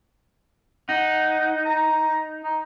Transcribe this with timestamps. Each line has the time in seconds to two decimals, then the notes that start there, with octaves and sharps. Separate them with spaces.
0.89 D#4 F#5
1.66 A#5
2.44 D#4